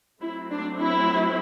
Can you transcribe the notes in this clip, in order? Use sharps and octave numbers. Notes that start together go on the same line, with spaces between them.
F#3 A3 C4 E4
D4
E4